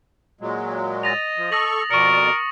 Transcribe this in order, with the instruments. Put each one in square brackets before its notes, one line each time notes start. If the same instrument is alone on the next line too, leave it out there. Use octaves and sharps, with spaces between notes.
[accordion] A#2 F#3 G#3
[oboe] D#5 [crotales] A6 A#6 F7
[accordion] F3
[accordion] A4 C#6 [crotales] D#6 A#6 F#7
[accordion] F2 B2 D5 [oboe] A#4 [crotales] C#6 C#7